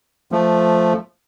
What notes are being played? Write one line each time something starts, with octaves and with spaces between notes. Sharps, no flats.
F3 A3